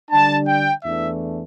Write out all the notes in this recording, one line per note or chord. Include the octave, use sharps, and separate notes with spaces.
D3 G3 D4 A5
G5
E2 E3 A3 D4 E5